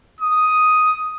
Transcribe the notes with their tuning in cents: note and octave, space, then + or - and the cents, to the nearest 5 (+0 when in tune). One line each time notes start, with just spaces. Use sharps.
D#6 +5